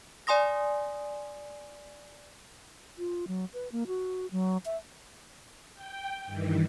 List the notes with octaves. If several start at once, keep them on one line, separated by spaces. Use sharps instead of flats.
D5 G#5 C6 D#6 A#6
F4
F#3
B4
A#3
F#4
F#3
E5
G5
G2 D#3 E3